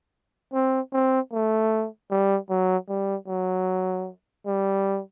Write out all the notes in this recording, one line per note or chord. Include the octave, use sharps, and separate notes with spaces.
C4
C4
A3
G3
F#3
G3
F#3
G3